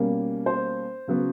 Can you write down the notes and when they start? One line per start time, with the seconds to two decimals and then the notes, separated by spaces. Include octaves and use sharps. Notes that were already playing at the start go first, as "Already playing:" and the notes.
Already playing: B2 G3 A#3 C#4
0.46 C5
1.07 C#3 F#3 B3